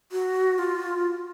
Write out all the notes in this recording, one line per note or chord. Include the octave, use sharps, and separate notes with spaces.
F#4
F4